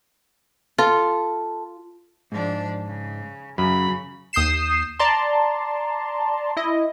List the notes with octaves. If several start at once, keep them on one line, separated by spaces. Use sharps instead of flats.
F4 A4
G#2 F3 D4
C#3
F#2 C#3 F#3 B5
D#2 D#6 G6 C7 E7
D5 A5 A#5 C6
E4 D#5